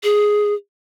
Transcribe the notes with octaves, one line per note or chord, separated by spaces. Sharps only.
G#4